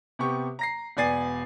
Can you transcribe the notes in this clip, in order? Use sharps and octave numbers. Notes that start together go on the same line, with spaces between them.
C3 B3 G4 C#6
A#5 A#6 C7
E1 B3 D5 G#5 A6 C7